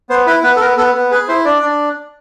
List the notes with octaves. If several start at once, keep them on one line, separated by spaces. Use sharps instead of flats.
B3 C5
E4 B4
B3 B4
A4
B3 A#4
B3 A4
B3
G#4 B4
E4 C5
D4 D5
D4